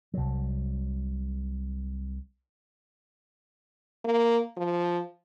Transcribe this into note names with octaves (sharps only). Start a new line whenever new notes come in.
C2 F#3
A#3
F3